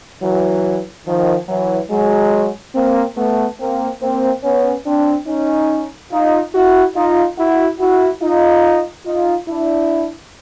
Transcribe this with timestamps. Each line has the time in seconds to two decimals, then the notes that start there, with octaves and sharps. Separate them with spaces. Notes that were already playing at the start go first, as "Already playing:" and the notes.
0.23 E3 F#3
1.07 D#3 F3
1.49 E3 F#3
1.91 F#3 G#3
2.75 A#3 C4
3.17 A3 B3
3.60 A#3 C4
4.02 A#3 C4
4.43 B3 C#4
4.86 C4 D4
5.27 C#4 D#4
6.12 D#4 F4
6.54 E4 F#4
6.96 D#4 F4
7.38 E4 F#4
7.80 E4 F#4
8.22 D#4 F4
9.06 D#4 F4
9.48 D4 E4